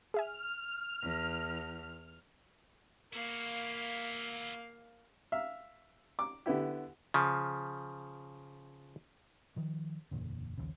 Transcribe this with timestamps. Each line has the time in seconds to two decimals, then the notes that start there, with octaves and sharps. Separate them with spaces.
0.14 G#4 E5 G#5 F6
1.02 E2
3.13 A#3 E4 F#4 F5
5.32 E5 F5
6.19 D6
6.46 D3 B3 E4 G4
7.14 C#3 F3
9.56 D#3 F3
10.11 F#1 E2 A#2 D3
10.58 A#1 D#2 A#2 C#3